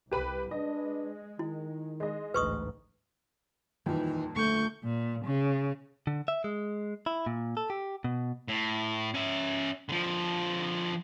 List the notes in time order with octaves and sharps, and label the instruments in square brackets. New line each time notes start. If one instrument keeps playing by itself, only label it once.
[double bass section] C2 [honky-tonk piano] G4 B4 B5
[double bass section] G#3 [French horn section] D4 B4 [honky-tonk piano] D#5
[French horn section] D#3 [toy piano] E4
[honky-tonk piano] G#3 D#5
[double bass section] A1 D2 G#2 [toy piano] B4 C#6 D#6
[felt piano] D#1 F2 A#2 [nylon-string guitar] D#3 E3
[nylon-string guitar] D3 [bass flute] A3 [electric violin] C#6 G6
[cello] A#2
C#3
[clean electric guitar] D3
E5
G#3
E4
A#2
A4
G4
B2
[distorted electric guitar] A2
C#4 E5
D3 F3